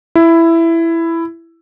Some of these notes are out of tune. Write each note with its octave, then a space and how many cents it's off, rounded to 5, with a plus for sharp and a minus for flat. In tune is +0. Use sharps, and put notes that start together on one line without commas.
E4 +10